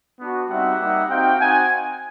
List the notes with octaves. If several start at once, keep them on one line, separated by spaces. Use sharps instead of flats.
B3 D4 F#4
G3 C4 D#4 F#4 E5 F#5
G3 A#3 D#4
C4 D#4 F#4 F5 G5
C4 D#4 F#4 F#5 G#5